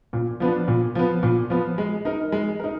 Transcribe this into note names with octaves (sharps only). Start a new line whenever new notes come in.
A#2
F3 B3 D4
A#2
F3 B3
A#2
F3 B3
G#3
D#4 A#4
G#3
D#4 A#4